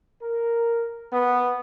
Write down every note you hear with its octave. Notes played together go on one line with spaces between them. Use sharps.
A#4
B3